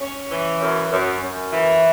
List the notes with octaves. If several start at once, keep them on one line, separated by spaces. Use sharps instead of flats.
C#4
E3
F#2
F#2
F#2
E3